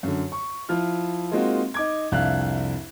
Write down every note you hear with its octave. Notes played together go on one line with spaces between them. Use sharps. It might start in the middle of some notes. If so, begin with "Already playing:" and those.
F#2 D3
C#6
F3 E4 F4 F6
G#3 A#3 C4 D#4 F4 F#4
D#4 D6 G#6
C2 F2 D4 E5 F5 F#6